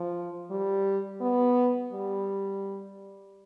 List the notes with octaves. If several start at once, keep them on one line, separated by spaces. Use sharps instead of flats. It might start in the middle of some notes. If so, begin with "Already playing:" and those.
Already playing: F3
G3
B3
G3